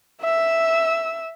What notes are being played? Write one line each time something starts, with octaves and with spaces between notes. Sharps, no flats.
E5 E6